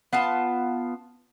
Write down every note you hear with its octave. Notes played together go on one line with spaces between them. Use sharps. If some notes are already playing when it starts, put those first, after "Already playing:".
B3 F4 F5 A5